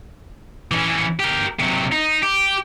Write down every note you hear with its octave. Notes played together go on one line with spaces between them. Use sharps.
E3 C#4
G4 A#4
C3 F#3
D#4
G4